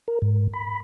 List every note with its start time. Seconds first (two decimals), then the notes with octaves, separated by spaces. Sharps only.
0.08 A#4
0.22 G#2
0.53 B5